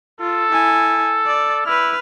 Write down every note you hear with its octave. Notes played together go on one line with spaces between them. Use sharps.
F4 A4
E4 G#5
D5
E4 B4 F6